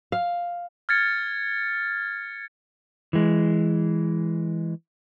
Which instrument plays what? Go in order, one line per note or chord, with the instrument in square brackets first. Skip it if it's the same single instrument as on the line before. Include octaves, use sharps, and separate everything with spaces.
[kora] F5
[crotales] F6 G#6 A6 C#7
[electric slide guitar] E3 G#3